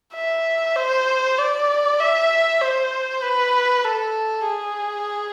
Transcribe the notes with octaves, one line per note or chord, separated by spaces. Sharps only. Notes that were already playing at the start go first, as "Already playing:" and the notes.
E5
C5
D5
E5
C5
B4
A4
G#4